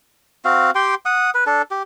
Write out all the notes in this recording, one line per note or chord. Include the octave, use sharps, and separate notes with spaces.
C4 F#4 F5
G4 G5 C6
F#5 D#6
B4
D4 A4
G4